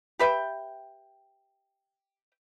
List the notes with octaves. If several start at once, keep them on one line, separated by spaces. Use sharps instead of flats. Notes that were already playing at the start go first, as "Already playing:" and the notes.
G4 B4 E5 G5